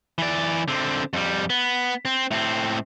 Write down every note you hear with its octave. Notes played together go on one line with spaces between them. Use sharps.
E3 D5
D3 C4
F2 G3
B3
C4
A2 C4